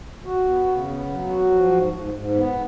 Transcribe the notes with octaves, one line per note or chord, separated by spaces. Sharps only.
F#4
B3
C#3
B3
F#3
F#4
F3
G#2
G#2
G#2
B3